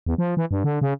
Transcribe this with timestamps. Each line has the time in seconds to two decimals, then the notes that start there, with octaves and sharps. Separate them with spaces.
0.06 E2
0.18 F3
0.37 E3
0.51 G2
0.64 D3
0.81 C#3